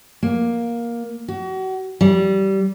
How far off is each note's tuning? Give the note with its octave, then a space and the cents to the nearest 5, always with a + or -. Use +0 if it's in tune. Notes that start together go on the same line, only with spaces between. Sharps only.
A#3 +10
F#4 +35
G3 -20